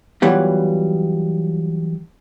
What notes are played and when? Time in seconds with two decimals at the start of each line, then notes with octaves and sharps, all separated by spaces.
0.22 E3 F#3 G3 B3 F4